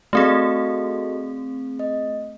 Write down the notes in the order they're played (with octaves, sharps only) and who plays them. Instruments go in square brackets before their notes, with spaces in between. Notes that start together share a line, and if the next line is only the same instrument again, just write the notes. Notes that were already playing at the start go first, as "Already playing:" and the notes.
[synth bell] A3 C4 G#4 [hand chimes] F#4 A4 D#5
[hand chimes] D#5